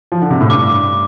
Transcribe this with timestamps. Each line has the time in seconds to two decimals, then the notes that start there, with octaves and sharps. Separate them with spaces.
0.12 F3
0.22 D3
0.30 C3
0.41 A2
0.50 G2 D6
0.73 D6